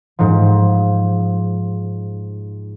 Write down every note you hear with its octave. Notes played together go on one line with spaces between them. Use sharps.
G#2 F3